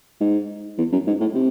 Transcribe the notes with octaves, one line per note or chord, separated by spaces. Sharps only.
G#2
E2
F#2
G#2
A2
C3